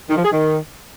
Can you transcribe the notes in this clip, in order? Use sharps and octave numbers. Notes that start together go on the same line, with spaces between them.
D#3
F3
G#4
D#3